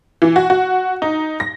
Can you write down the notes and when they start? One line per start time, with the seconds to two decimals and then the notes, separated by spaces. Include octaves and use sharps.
0.22 E3
0.36 F#4
0.50 F#4
1.02 D#4
1.40 A#6